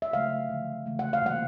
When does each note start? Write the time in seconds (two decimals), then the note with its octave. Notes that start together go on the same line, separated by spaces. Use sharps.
0.02 E5
0.13 C#3 F#3 A3 F5
0.49 D3 F3 A3
0.86 C#3 E3 A3
0.99 F#5
1.13 F5
1.22 C3 E3 G3 A#3 F#5